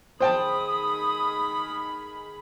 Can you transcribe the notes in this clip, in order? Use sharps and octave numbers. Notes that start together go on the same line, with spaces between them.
D#3 G#4 C5 G5 A5 B5 D#6